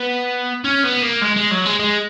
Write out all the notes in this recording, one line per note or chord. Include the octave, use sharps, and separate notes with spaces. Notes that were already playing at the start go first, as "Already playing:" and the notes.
Already playing: B3
C#4
B3
A#3
G#3
G#3
F#3
G#3
G#3